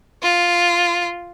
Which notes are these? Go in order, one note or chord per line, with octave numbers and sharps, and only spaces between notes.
F4